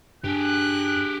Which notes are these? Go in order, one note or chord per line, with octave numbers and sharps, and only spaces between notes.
G2 D4 G4 G#4 F#6